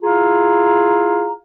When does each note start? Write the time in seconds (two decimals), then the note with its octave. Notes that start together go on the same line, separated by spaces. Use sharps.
0.03 E4 F4 G#4 F5 A#5